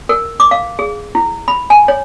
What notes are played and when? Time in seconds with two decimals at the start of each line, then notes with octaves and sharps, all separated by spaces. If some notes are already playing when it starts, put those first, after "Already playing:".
0.09 A#4
0.40 D6
0.51 F5
0.79 G#4
1.15 E4
1.48 B5
1.70 G#5
1.88 C#5